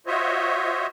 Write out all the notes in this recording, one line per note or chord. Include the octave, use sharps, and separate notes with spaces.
F4 F#4 C5 C#5 D#5 E5